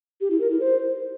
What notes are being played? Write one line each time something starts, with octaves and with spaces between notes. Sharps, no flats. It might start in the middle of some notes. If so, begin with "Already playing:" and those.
G4
E4
A#4
E4
C5